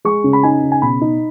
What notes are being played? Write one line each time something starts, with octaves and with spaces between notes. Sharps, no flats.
G#3 C#6
C#3
B5
D#4 G#5
C#3
G#5
B2 B5
D#4